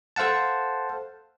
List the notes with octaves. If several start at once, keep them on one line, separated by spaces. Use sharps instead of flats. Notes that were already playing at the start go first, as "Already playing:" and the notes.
A4 C5 F5 F#5 A5